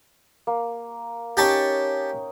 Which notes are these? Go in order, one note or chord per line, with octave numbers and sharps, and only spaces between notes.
A#3
C#4 D#4 G4 G5 A5 C#6